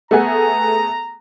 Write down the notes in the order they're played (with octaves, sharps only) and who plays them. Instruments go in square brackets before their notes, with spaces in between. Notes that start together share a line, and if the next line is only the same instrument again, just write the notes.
[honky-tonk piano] A3 B3 G#4 [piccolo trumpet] A#5